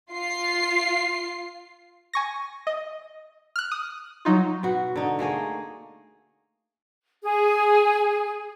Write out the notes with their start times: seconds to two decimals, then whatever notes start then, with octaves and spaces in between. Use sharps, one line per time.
0.11 F4 C7
2.13 G#5 C#6 A#6
2.67 D#5
3.56 F6 F#6
3.71 D#6
4.25 F#3 D#4 F4
4.63 B2 F#4
4.96 D3 D#4
5.19 A3 A#3 G#4 D#5
7.22 G#4